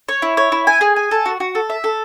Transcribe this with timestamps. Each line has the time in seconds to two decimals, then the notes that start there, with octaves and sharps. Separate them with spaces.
0.09 C#5
0.22 E4
0.37 C#5
0.52 E4
0.67 G#5
0.81 G#4
0.96 G#5
1.11 A4
1.26 F#4
1.40 F#4
1.55 A4
1.70 E5
1.84 A4